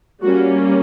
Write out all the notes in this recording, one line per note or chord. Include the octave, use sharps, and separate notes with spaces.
G3 A#3 C#4 F#4